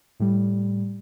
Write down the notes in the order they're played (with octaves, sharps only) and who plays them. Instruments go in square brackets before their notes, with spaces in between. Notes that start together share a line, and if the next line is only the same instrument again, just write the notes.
[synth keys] A2 G3